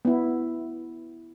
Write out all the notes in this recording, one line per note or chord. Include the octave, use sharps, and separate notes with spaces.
B3 E4